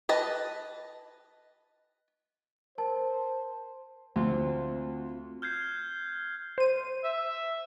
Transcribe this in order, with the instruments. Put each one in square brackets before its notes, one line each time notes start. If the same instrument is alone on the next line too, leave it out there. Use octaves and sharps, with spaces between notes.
[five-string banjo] B4 D#5 A5
[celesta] A#4 A5 [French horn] C5
[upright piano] D2 [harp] C4 F4
[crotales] F6 G6 G#6 C7
[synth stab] C5 D#7
[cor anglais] E5